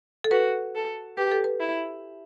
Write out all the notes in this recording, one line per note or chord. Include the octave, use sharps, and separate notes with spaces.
A4
F#4 B4
A4
G4 B4
A4
B4
E4